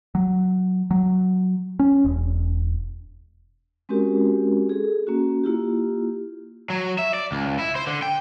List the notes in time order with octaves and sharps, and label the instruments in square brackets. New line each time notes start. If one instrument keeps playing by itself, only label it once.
[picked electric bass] F#3
F#3
C#4
E1
[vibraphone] G#3 C4 C#4 F#4 G4 A#4
G#4 A4
A#3 C#4 F#4
A#3 E4 F4 G4
[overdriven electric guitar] F#3
E5
D5
C#2
E4
C5
D3
G5